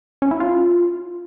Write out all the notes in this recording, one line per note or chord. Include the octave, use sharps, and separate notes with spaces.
C#4
E4
F4